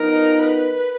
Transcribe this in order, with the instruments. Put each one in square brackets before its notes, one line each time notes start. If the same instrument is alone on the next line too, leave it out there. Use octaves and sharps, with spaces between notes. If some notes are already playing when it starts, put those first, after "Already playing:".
Already playing: [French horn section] F3 B3 D#4 [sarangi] A#4
[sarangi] B4